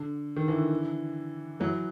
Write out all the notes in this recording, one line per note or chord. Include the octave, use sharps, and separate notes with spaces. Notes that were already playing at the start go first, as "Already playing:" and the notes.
Already playing: D3
D#3
D3 E3
E3 F#3